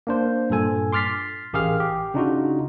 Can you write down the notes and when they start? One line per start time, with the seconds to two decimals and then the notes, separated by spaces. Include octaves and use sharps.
0.07 A#3 D4 C5
0.50 G2 A#2 A4 G#5
0.93 C6 D6 F6 A6 B6 C7
1.53 A1 G4 G#4 A#4 F5 F6
1.80 G4
2.14 C#3 D4 D#4 F4 F#4